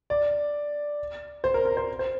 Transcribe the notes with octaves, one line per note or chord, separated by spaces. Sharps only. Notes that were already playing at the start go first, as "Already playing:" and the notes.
D5
C5
A#4
A#4
C5
C5